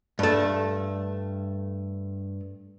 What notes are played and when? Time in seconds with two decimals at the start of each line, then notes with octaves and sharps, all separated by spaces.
0.19 G2 A3